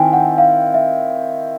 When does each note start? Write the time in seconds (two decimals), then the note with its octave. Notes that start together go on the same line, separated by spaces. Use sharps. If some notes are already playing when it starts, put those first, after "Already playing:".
Already playing: D#3 C4 E4 G5 G#5
0.13 F#5
0.38 F5
0.74 E5